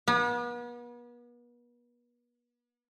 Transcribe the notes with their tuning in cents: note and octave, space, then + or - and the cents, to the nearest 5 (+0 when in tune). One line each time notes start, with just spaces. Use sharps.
B3 -40